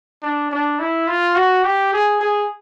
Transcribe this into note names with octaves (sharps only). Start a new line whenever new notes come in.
D4
D4
E4
F4
F#4
G4
G#4
G#4